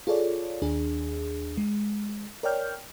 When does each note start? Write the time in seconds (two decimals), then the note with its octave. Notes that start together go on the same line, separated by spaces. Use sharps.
0.07 F4 G#4 A4 C#5 D5
0.62 D#2 D4 G#4
1.57 G#3
2.43 A#4 C#5 D5 G5 F6 G6